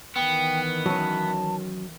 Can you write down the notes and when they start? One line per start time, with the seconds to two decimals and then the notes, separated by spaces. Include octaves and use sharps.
0.16 D#3 E3 B3 G5
0.86 F#3 C#4 A5